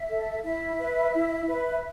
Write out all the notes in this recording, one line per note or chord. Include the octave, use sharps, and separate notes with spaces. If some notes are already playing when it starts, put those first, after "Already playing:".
Already playing: E5
A4
E4 E5
B4
E4
B4